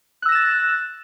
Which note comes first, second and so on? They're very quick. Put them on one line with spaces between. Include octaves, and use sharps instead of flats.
F#6 E6 A#6 E7 A6